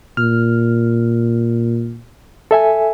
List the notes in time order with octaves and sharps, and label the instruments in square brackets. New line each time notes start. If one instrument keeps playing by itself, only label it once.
[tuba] A#2 [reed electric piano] F6
[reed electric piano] A4 E5 G#5